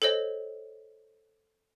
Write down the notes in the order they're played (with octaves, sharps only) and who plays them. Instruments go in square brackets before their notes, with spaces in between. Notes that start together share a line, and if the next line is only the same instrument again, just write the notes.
[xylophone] A4 C5 C#5 D#5